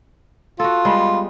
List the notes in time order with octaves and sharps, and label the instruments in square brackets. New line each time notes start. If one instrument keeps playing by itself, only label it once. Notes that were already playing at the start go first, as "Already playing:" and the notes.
[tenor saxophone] F4 [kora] F#4 A4
[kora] G3 G#3 B3